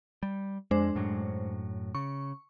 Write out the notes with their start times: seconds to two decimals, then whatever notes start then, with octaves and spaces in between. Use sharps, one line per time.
0.23 G3
0.71 F2 G#3 D4 C5
0.95 F#2 A2 F#3
1.95 C#3 C#6